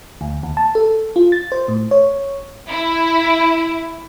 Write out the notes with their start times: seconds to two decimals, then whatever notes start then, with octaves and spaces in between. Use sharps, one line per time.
0.21 D2
0.43 D#2
0.57 A5
0.75 A4
1.16 F4
1.32 A6
1.52 C5
1.68 A2
1.91 C#5
2.67 E4